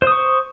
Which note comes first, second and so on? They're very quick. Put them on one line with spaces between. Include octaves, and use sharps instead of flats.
C5 D#6 C#6